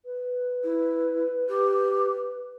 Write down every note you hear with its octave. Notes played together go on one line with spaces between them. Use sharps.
B4
E4
G4